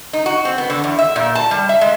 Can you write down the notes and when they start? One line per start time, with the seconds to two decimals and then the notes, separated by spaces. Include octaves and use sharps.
0.13 D#4
0.26 F#4
0.45 C4
0.58 B3
0.70 D3
0.84 E2
0.99 E5
1.16 A#2
1.35 A5
1.51 G3
1.69 E5
1.81 G#3